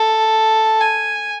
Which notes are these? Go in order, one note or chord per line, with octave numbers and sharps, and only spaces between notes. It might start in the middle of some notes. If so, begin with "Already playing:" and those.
Already playing: A4
G#5